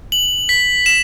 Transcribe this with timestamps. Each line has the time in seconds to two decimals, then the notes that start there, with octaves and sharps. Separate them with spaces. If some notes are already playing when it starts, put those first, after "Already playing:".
0.12 F#7
0.49 B6
0.86 E7